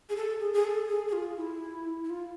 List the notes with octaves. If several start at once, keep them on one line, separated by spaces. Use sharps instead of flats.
G#4
A4
G#4
G#4
A4
G#4
G#4
F4
E4
E4
F4